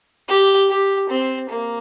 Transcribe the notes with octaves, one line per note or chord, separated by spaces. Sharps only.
G4
G4
C4
A#3